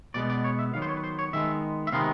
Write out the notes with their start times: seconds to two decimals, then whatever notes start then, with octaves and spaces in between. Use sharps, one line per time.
0.14 B2 G#3 B3 D5
0.30 D5
0.44 C#5
0.59 E5
0.74 D#3 F#3 B3 F5
0.82 C5
0.89 C#5
0.97 B4
1.04 C5
1.19 C#5
1.33 D#3 G#3 B3 E5
1.87 E5
1.92 C3 D#3 G#3 B3 F5